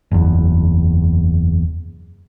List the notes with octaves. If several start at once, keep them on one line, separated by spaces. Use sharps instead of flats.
F#1 E2